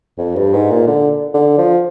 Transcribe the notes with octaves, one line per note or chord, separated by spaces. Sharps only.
F2
G2
G#2
A#2
D3
D3
F3